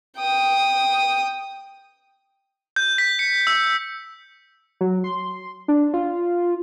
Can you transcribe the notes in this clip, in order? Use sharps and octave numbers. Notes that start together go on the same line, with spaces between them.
G5 D#6
G6
B6
C#7
E6
F#3
C6
D4
F4